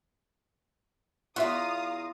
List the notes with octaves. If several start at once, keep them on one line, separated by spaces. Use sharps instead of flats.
E2 F4 F#4 E5 F5 A#5 D#6